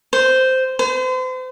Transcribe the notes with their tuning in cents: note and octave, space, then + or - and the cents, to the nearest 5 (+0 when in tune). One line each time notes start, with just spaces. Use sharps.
C5 -10
C5 -40